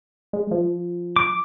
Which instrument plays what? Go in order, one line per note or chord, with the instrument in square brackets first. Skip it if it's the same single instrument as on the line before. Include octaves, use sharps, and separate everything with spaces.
[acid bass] G#3
F3
[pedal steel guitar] D6